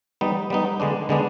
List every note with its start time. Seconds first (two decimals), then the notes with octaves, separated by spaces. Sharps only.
0.21 G3 B3 D#4
0.50 G3 B3 D#4
0.80 D3 G#3 B3 D4
1.09 D3 G#3 B3 D4